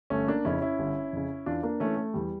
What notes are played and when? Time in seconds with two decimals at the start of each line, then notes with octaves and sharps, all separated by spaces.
0.10 G1 A3 C#4
0.28 A#3 D4
0.45 F2 C#3 C#4 E4
0.62 C#4 E4
0.79 G1
1.13 F2 C#3
1.46 E2 D4 F4
1.63 A#3 D4
1.80 E3 A3 C#4
1.97 A3
2.14 E2 G3